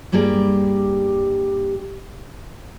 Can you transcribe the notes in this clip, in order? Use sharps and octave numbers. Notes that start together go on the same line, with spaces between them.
G2 G3 A#3 G4 G#4 D5